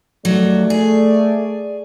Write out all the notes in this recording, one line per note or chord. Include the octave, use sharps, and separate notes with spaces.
D#2 F#3 G#3 A3 D5
G#4 D5